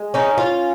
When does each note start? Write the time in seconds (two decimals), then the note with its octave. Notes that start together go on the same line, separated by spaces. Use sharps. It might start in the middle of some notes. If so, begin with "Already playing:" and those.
Already playing: G#3
0.14 C#4 D#4
0.38 F4